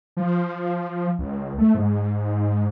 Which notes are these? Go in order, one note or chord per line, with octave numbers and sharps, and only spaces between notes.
F3
C#2
A3
G#2